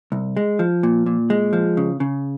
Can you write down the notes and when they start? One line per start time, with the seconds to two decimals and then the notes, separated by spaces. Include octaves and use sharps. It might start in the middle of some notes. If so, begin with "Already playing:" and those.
0.12 C2
0.37 G#3
0.59 F3
0.83 A#2
1.06 A#2
1.30 G#3
1.53 F3
1.77 C#3
2.00 C#3